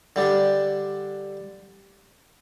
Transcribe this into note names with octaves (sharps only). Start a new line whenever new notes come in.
D3 G3 D4